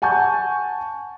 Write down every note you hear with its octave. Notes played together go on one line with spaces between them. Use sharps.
F#5 G#5 A5 C#6 G6